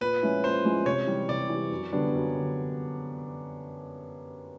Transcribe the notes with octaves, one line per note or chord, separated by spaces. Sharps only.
A#2 B4
F3 G#3 C#4 E4
A#2 C5
F3 G#3 C#4 E4
C3 C#5
E3 G3
C3 D5
E3 G3
F#2
D3 G3 B3 D4
F#2
D3